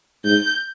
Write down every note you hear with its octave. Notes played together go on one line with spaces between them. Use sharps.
G#2 G6